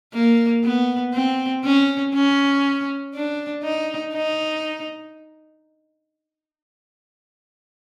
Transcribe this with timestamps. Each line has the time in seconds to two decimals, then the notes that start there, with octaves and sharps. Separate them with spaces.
0.14 A#3
0.64 B3
1.14 C4
1.65 C#4
2.14 C#4
3.15 D4
3.64 D#4
4.13 D#4